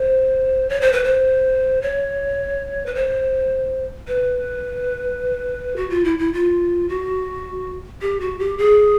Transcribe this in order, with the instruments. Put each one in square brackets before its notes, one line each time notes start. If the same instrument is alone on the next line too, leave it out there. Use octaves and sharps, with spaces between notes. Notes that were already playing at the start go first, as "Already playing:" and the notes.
Already playing: [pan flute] C5
C#5
C5
B4
C5
C#5
B4
C5
B4
F#4
F4
E4
E4
F4
F#4
G4
F#4
G4
G#4